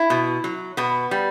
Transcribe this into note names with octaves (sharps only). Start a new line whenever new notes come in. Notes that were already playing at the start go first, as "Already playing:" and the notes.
Already playing: E4
B2
F#3
B2 B3
G3